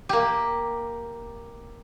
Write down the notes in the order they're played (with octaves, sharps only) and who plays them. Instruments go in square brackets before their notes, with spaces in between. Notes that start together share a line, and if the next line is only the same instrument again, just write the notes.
[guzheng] A#3 G4